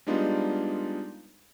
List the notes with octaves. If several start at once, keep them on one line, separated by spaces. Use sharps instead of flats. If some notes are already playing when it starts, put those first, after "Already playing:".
G3 G#3 B3 D4 D#4 F4